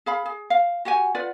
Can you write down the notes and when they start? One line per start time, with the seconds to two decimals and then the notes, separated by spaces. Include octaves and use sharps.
0.06 G#4 F5 B5
0.26 G#4
0.50 F5
0.85 F#4 G4 F#5 G#5
1.15 F4 B4 D5 F#5